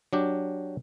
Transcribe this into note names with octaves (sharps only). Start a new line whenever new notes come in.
F#3 D4 G4